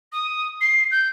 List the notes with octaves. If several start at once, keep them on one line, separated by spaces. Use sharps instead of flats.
D#6
C7
G6